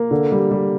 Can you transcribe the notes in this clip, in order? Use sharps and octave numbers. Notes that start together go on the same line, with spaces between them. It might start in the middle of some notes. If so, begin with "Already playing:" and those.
Already playing: A#3
D3
G3
G3